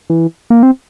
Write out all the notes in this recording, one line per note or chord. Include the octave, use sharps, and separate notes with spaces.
E3
A#3
C4